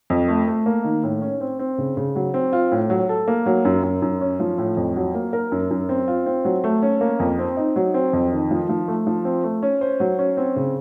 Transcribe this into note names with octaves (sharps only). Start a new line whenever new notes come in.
F2
A3
A3
A#3
D#3
A2
C#4
C4
C4
C#3
C#3
F#3
C4
F4
A2
F#3
A4
A#3
F#3
F#2
F#2
F#2
C#4
F3
A2
F2
F#3
A#3
A#4
F#2
F#2
C4
F4
C4
F#3
A3
C#4
A#3
F2
C4
D#4
F#3
C4
F2
D#3
F3
F3
A3
F3
C4
A3
C#4
C5
F#3
C#4
C4
C#3